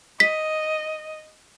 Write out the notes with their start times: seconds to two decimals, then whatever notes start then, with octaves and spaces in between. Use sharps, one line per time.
0.20 D#5 B6